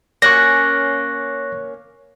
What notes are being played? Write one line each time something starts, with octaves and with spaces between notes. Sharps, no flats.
A#3 C#4 C#6 F#6 A#6